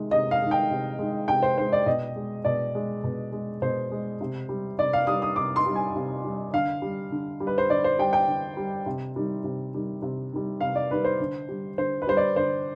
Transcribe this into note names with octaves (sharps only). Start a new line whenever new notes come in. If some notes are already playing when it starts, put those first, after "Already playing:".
Already playing: C3 D#3 G#3
C3 D#5
F5
D#3 G#3
G5
C3
D#3 G#3
C3 G5
C5
D#3 G#3 C5
D5
B2 D#5
G#3
B2 D5
G#3
B2
G#3
B2 C5
G#3
C3
G3
C3 D5
F5
G3 D#6
D#6
C3 D6
C6
G3
G#5
C3
G3
D3 F5
G3
D3
G3
B4
C5
D3 D5
C5
G3 G5
G5
D3
G3
C3
D#3 G3
C3
D#3 G3
C3
D#3 G3
C3 F5
D5
D#3 G3 B4
C5
D3
G3
D3 C5
B4
G3 C5
D5
D3 C5